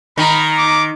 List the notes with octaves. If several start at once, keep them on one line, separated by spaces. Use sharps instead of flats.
D#3 D#4 A#5 B5
D6